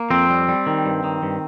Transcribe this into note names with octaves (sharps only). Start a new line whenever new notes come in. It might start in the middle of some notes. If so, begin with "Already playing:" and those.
Already playing: A#3
F2 C4
G3
G3
D#3
G2
D#3
G2